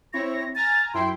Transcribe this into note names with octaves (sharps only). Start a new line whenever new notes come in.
C4 E4 C#5 A#6
G#5 A#5 F6 A6
F#2 E4 G5 C6